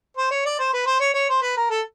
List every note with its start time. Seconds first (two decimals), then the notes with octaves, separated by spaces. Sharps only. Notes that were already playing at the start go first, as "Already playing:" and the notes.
0.17 C5
0.31 C#5
0.45 D5
0.59 C5
0.73 B4
0.87 C5
1.00 C#5
1.14 C#5
1.29 C5
1.42 B4
1.57 A#4
1.70 A4